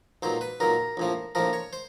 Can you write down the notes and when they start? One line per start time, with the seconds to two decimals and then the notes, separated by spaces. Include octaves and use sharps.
0.22 B1 A#2 F#3 C5
0.41 B4
0.60 B1 A#2 F#3 A#4
0.97 A#1 A2 F3
1.35 A#1 A2 F3 A#4
1.53 C#5
1.73 C5